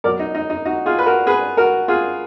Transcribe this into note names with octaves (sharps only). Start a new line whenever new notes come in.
B2 F#3 A#3 A#4 D5
D#4
D#4
D#4
D#4 F#4
F4 G#4
B4
F#4 A#4
G#4 B4
F#4 A#4
F4 G#4